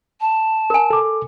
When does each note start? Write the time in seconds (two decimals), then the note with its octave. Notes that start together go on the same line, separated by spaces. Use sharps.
0.21 A5
0.70 A#4 G#5
0.90 A4 D6